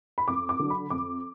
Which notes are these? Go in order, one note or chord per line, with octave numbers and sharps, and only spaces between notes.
B5
F2 D6
D6
D3 F#3 D4
B5
F2 D6